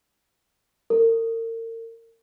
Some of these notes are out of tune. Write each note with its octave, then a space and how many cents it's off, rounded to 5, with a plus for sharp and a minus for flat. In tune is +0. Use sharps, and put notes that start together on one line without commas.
A#4 -40